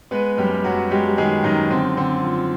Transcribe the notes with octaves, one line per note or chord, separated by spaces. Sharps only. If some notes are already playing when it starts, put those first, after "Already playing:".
G#3 B3 B4
F#2 G3 G4
F#2 F#3 F#4
G3 G#3 G4
G4
D#3 G#3 G#4
F#2 D#3 D#4
D3 C4
D3 C4
F3